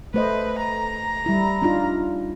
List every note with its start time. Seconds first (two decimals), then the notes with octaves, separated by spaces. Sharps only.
0.14 A3 B4 C5 D#5
0.59 A#5
1.26 G3 E4
1.62 D4 D#4 F4